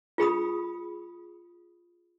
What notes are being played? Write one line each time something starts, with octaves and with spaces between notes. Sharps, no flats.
F4 G#4 B5 D#6